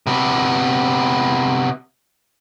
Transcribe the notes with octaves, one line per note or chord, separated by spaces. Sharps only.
C3 B3